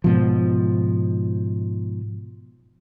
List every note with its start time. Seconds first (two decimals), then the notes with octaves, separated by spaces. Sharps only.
0.04 G#2 B2 F3